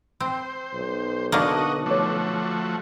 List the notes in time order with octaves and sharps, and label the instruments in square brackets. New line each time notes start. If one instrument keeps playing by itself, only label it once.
[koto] C4 [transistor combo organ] C5
[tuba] B1
[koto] D3 A#3 [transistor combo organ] F#4 D#5 [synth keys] A5 C#6
[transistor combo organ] F3 A3 F#4 [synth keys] C#5 D6